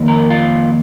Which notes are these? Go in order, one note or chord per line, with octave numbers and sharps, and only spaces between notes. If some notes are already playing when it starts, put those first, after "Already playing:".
Already playing: F2 D#3 A#3
A#4
F4